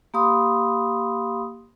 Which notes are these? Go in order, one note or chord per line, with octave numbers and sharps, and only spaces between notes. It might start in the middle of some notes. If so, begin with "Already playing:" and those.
A#3 G4 F5 B5 C6 D#6